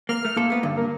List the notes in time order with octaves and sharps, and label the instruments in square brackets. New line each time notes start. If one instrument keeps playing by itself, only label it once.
[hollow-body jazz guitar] A#3 [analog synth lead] F6
[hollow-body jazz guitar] A3
[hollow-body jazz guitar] A#2 A4 [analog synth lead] A#3
[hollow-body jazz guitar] A3 B3
G2 D3
[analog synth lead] A#3